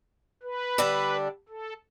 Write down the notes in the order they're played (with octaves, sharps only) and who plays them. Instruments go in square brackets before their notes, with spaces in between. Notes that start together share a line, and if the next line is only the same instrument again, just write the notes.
[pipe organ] B4
[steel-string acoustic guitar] D3 G3 D4 A4
[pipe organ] A4